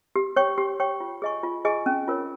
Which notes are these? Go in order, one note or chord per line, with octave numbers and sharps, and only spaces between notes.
G4
C#5 G5 C#6
G4
C#5 G5 C#6
F4
G#4 D#5 G#5 C#6
F4
G#4 D#5 G#5 C#6
C#4
F4 A#4 C#5